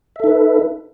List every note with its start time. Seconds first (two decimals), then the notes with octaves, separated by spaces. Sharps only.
0.16 E5
0.20 A4
0.24 D#4
0.28 B4